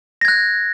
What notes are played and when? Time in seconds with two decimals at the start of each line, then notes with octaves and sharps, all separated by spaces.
0.21 A#6
0.25 G#6
0.28 F#6